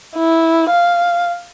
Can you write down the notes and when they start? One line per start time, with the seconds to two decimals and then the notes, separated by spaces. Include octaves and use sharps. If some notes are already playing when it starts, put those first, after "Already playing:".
0.17 E4
0.70 F5